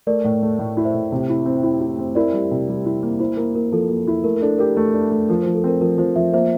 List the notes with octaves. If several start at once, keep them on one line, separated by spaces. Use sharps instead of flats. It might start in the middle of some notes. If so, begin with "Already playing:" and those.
A3 A#4 D5
A2
A3
A2
E4
C5 E5
A2
C3
E4
C4
E4
E4
C4
E4 A#4 D5
G3
C3
G3
E4
A#3
E4 C5
A#3 A#4
A#3 A#4
F3 A4
A#3
E4
A3 A#4
A#4
D4 A4
G4 A#4
A3 A4
D4
A3
F3 A#4
F3 C5
A4
C4 A#4
F3 A#4
F3 C5
F3 C5 E5
A#3 C5 E5